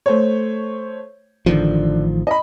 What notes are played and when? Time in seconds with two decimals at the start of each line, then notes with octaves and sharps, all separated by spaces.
0.06 A3 C5 C#5
1.46 A1 D3 D#3 F3
2.27 D#5 B5